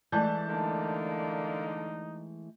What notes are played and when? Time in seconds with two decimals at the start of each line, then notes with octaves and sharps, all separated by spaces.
0.12 E3 G#3 A3 D5 A5 G6
0.48 D3 A#3 D#4